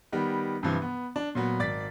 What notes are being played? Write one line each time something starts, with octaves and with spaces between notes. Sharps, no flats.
D#3 G3 B3
G2 C3 E3 F3
B3
D4
A#2 F#3 B3
G#1 D5 A6 B6